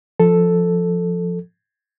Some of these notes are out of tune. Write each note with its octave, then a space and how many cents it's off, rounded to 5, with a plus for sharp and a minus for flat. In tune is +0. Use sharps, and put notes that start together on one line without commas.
F3 +0 A4 +0